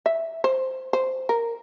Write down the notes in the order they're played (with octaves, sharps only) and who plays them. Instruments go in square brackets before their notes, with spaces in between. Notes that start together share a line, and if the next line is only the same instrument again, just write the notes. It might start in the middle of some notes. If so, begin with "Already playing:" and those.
[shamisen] E5
C5
C5
A#4